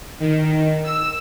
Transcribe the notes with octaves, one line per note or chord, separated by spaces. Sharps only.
D#3
E6